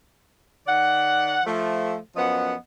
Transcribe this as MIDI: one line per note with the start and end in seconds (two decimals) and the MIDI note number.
0.67 1.41 51
0.67 1.41 74
0.67 1.41 78
1.45 1.97 53
1.45 1.97 57
2.16 2.56 42
2.16 2.56 53
2.16 2.56 59
2.16 2.56 75
2.16 2.56 78